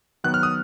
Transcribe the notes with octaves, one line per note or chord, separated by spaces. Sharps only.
D#3 F#3 B3 F#6
F6
D#6